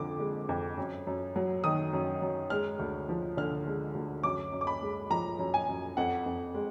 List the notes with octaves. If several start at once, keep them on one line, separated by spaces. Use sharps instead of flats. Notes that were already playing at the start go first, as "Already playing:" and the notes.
Already playing: F2 D3 F3 D6
G#3
F2
F#2
F#2
F#3
D#3 D#6
F#2
F#2
G#3 F6
D2
F3
D3 F6
G#3
D2
F#2 D6
F#2
D6
B5
G#3
F3 A#5
F#2
G#5
F#2
F2 F#5
F2
G#3